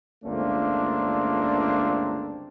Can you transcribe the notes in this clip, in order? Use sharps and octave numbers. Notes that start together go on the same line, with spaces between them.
G1 C#2 A3 A#3 C4 D4